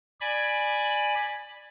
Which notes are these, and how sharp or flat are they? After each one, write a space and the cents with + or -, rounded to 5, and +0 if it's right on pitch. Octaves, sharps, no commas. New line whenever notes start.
D5 +20 G#5 +0 B5 -5